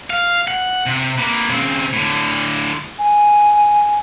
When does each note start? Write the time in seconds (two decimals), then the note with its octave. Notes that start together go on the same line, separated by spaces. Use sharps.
0.10 F5
0.48 F#5
0.86 C3
1.18 A#3 B4
1.49 C#3 C4
1.93 A2 D3
2.99 G#5